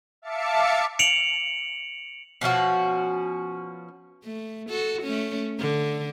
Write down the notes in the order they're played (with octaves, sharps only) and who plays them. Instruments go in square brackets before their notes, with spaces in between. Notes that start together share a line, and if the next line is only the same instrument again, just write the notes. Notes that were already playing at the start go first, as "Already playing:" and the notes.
[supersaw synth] E5 F5 A5 D6 C#7
[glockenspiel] C#7 D7 F7 F#7
[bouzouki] B2 F3 C#4 F#4
[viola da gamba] A3
F#4 A4
A3 C#4
D3